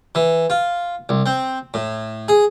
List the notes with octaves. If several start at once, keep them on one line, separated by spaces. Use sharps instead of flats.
E3
F4
C2
C4
A2
G#4